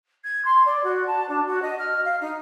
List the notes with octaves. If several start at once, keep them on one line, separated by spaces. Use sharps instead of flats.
G#6
C6
D5
F#4
A5
D4
F#4
D#5
F6
F5
D#4